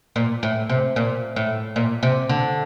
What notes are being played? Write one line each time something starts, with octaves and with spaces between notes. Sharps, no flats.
A#2
A2
C3
A#2
A2
A#2
C3
D3